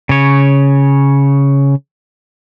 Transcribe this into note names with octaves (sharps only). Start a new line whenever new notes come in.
C#3 C#5